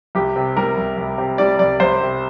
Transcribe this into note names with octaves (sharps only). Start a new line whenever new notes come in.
C2 G4
C3
G3 A#4
C2
C2
C3
G3 D5
C2 D5
C2 C5
C3